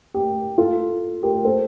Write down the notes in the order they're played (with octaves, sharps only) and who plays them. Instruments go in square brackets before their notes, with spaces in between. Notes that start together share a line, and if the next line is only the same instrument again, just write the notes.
[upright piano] G4
F4 A4
G4 A#4
A4 C5